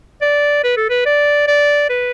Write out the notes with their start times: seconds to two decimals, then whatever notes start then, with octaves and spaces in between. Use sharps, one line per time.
0.22 D5
0.64 B4
0.77 A4
0.90 B4
1.05 D5
1.47 D5
1.89 B4